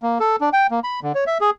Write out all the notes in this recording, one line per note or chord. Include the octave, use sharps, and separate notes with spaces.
A#3
A4
D4
G5
A#3
B5
D3
C#5
E5
G#4